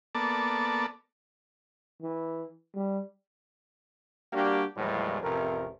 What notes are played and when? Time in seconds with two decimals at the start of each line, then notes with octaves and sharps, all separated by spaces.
0.15 A#3 B3 A4 D5 A5
2.02 E3
2.75 G3
4.33 G3 A#3 D4 F#4 G4
4.77 D#2 A2 E3 F3 G3 G#3
5.22 A1 F2 C3 A3 A#4